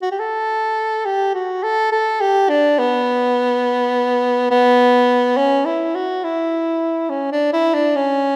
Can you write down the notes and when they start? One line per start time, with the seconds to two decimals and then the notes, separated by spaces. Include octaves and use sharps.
0.02 F#4
0.11 G4
0.19 A4
1.05 G4
1.34 F#4
1.63 A4
1.92 A4
2.21 G4
2.49 D4
2.79 B3
4.50 B3
5.37 C#4
5.65 E4
5.95 F#4
6.24 E4
7.09 C#4
7.32 D4
7.53 E4
7.74 D4
7.96 C#4